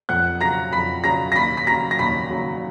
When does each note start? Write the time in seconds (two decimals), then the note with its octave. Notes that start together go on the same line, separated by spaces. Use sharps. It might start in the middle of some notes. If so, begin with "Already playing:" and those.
0.09 F2 F#5 F#6
0.41 C#3 F#3 A#5 A#6
0.72 F2 B5 B6
1.04 C#3 F#3 A#5 A#6
1.32 A#6
1.36 D#2 B5 B6
1.57 B6
1.67 C#3 F#3 A#5 A#6
1.91 A#6
1.99 D#2 B5 B6
2.30 C#3 F#3